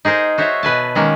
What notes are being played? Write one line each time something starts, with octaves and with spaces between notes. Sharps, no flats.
D#4 G#4 A#4 C5
F#4 C5 C#5 E5
B2 B4 G#5 A5
D#3 G#3 A#3 C#4